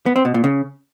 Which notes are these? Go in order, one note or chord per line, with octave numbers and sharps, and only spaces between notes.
B3
C4
B2
A#2
C#3